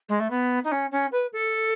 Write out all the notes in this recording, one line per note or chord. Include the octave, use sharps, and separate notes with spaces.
G#3
A3
B3
D#4
C#4
C#4
B4
A4